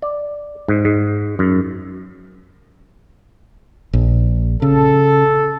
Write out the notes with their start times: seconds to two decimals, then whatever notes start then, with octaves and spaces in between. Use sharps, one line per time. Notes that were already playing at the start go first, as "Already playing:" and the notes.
0.02 D5
0.68 G#2
0.85 G#2
1.39 F#2
3.93 A#1
4.62 C#3 A4